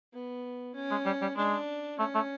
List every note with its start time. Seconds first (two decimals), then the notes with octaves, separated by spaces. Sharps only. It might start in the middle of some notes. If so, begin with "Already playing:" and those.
0.13 B3
0.75 C#4
0.91 G#3
1.05 G3
1.21 G3
1.37 G#3 D4
1.99 A3 C#4
2.15 A3